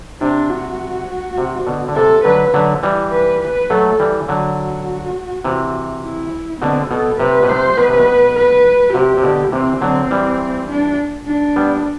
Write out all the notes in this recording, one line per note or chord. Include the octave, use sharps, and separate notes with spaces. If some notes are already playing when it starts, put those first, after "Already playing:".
C3 D4
F#4
C3
B2 D3
D3
C3 A4
D3 F#3 B4
D3 F#3
E3 G3
B4
B4
F#3 A3 A4
E3 G3
D3 F#3 F#4
C3 E3
E4
B2 D3 C4
B2 A4
C3 B4
B2
C3 C5
B2 B4
C3
B2
B4
C3 G4
C3
B2 D3
C3 E3 C4
D3 F#3 C4
E3 G3
D4
D4
G3 B3